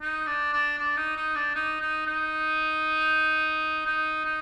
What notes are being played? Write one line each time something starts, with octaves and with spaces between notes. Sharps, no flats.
D#4
D4
D4
D4
D#4
D#4
D4
D#4
D#4
D#4
D#4
D#4